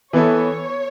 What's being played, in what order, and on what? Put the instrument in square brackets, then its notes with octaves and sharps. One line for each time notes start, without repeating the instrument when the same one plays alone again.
[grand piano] E3 B3 E4 A4 [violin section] C#5